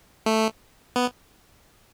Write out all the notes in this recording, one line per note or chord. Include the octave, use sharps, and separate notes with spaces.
A3
B3